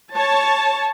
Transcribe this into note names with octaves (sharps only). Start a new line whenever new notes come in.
C#5 A5